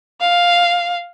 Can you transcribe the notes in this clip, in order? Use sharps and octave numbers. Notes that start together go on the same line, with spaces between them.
F5